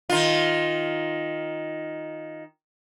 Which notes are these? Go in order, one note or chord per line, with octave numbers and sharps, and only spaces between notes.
D#3 F4